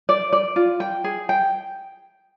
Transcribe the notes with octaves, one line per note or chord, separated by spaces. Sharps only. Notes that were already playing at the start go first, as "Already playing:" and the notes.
D5
D5
F4
G5
G#4
G5